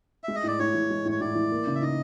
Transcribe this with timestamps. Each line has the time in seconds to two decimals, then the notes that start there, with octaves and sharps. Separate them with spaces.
0.24 G#3 E5
0.35 D#5
0.43 A2 D5
0.59 A2 C#5
0.74 E3
0.90 G#3
1.05 A2
1.12 C#5
1.20 A2 D5
1.35 E3
1.51 A#3
1.67 C#3
1.75 E5
1.82 D#4 D#5